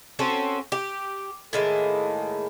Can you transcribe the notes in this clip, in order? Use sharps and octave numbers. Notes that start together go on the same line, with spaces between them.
C4 C#4 F#4 A4
G4
A2 D#3 G#3 A#3